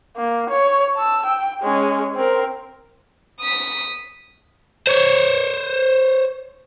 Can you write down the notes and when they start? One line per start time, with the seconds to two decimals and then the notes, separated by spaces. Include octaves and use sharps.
0.16 A#3
0.50 C#5
0.95 A5 E6
1.26 G5
1.62 G#3 C#4
2.15 C4 A#4
3.41 D#6 B6
4.87 C5 C#5